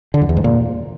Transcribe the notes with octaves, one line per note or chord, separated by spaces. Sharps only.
D3
F2
E2
G#2
A#2